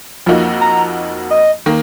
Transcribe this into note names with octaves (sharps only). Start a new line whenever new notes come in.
F2 F3 A#3 D#4 F#4
A#5
D#5
D#3 A#3